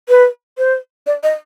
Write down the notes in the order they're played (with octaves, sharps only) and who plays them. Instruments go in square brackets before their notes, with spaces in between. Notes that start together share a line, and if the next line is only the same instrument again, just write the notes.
[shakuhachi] B4
C5
D5
D#5